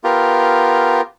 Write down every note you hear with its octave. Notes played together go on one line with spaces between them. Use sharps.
B3 F4 G4 A#4